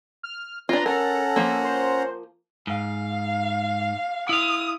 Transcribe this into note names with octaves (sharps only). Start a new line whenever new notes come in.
F6
D4 F4 B4 A#5
C#4 A4 A#4 F#5 A#5
F3 A#3
C5
G#2 F5
E4 F5 D#6